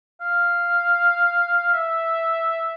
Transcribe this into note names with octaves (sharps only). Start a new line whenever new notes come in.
F5
E5